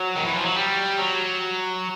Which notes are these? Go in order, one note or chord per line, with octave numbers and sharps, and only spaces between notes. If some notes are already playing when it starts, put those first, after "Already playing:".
Already playing: F#3
D#3
E3
F3
F#3
G3
F#3